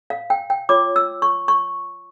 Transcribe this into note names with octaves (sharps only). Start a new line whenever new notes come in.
F5
G5
G5
F4 C#5 D6
E6
C#6
C#6